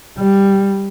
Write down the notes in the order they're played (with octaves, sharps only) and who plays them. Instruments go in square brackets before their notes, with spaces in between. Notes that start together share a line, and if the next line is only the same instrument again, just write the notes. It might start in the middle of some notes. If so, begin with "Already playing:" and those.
[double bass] G3